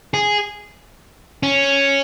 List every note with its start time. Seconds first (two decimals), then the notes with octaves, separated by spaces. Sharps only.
0.14 G#4
1.43 C#4